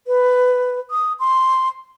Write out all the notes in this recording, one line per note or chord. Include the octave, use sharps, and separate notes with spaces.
B4
D#6
C6